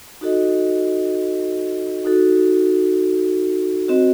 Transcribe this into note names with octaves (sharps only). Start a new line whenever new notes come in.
D#4 F#4 A4 D#5
D#4 F#4 A4
C4 F#4 C5 D#5